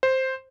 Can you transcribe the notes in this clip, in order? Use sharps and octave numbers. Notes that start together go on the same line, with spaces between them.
C5